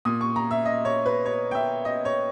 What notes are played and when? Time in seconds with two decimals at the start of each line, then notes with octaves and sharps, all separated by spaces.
0.05 A#2 D#6
0.21 C#6
0.36 A#5
0.51 E5
0.65 D#5
0.85 C#5
1.06 B4
1.26 C#5
1.51 G5
1.55 E5
1.85 D#5
2.05 C#5